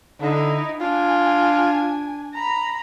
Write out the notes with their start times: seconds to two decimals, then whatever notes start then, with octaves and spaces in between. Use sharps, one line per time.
0.20 D3 D#4 E4
0.81 D4 F4 G#5
2.34 A#5 B5